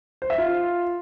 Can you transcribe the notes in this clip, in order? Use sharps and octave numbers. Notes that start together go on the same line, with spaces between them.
C5
E5
F4